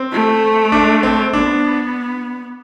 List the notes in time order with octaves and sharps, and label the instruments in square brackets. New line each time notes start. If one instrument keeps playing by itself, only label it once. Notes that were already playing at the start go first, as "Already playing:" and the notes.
Already playing: [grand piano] C4
[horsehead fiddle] A3
[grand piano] D4
C4
[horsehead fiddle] B3 [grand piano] D4